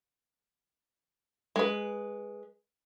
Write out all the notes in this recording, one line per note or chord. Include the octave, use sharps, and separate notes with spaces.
G#3 B4